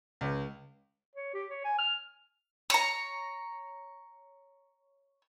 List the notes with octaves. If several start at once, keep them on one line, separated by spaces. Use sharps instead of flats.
C#2
C#5
G4
C#5
G#5
F6
C#5 A#5